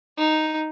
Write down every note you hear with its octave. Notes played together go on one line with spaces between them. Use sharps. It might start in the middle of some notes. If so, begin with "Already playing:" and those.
D#4